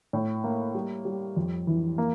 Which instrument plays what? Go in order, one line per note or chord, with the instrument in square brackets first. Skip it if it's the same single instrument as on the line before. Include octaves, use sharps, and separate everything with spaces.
[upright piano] A2
A#3
G3
G3
F2
E3
A#3